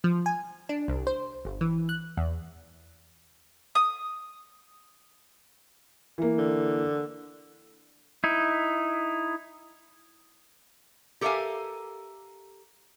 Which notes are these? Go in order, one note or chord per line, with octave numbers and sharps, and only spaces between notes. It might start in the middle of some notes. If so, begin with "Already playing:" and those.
F3
G#5
D4
C2
C5
G1
E3
F#6
E2
D#6
E3 A#3
D3
D#4 E4
G4 A4 A#4 E5 F5 G#5